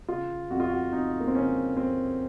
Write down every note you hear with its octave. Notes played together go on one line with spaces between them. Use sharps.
C#3 F4
F2 F#4
F4
F#4
F2 D#4
A#3
C4
C#3 C#4
F2 C4